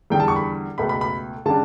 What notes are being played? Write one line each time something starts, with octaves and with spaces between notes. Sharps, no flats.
E2 D3 G3 D4 G5
A5
C#6
B5
C#2 B2 A3 B5
B5
B5
C#3 G3 D4 A5